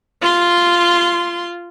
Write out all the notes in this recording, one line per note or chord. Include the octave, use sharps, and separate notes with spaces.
F4 C6